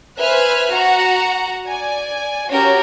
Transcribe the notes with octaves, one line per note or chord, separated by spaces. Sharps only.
B4 C5 E5 G#5 F6 F#6
F#4 F#5 A#5
D5 G#5
C#4 F#4 G4 A#4